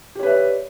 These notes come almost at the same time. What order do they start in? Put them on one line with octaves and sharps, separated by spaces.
G4 C#5 B4 E5 D5